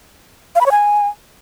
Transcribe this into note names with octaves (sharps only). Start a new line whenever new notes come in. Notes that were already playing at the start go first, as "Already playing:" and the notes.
F5
B5
C#5
G#5